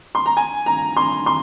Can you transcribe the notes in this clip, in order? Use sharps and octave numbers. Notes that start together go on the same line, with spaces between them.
C6
A#5
G#5
A#5
C6
C6